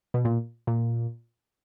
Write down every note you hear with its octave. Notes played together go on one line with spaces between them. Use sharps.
B2
A#2
A#2